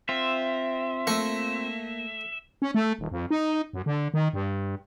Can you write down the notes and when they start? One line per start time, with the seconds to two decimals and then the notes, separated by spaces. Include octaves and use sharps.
0.09 C4 F4 E5
1.07 A3 A#3 C#6
2.62 C#4
2.75 A3
2.99 D#1
3.11 F2
3.31 D#4
3.73 F#2
3.86 D3
4.14 D#3
4.33 G2